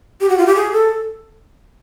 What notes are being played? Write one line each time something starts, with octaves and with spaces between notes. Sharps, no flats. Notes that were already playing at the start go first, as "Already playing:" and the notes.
G4
F#4
F4
G4
G#4
A4